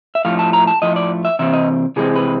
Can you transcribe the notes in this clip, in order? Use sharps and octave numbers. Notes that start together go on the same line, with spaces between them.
E5
A2 F3 A3 F5
A5
A#5
A5
A2 F3 A3 D#5
D5
E5
C3 E3 C4 E5
D#5
C3 E3 G#3 C4 G#4
B4